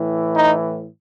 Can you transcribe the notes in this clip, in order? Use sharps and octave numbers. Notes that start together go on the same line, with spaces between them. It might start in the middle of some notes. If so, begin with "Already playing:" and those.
Already playing: A2 E3
D#4